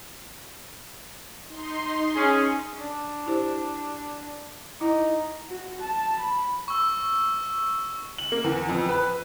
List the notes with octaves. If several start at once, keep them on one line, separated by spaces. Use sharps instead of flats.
D#4 C6
C#4 G#4
D4
E4 G4 C5
D#4 E4
F#4
A5
B5
C#6 E6
F#7
A#3
E2
F2
B4